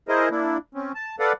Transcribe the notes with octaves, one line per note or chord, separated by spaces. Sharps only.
E4 G#4 A#4 C5 D#5
A#3 D4 E4
C4 C#4
A5
A4 B4 D5 F5 F#5